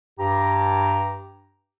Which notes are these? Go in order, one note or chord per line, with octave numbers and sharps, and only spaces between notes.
G2 G4 A#5